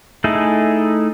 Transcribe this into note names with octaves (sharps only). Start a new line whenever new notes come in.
A3 D#4 E4 G#4 A4